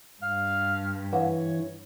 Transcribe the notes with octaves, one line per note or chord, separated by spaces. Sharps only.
G2 F5
E3 C#5 F5 F#5